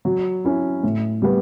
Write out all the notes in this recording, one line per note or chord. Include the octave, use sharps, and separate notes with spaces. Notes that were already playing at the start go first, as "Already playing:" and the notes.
F#3
C#4 E4
A2
G3 B3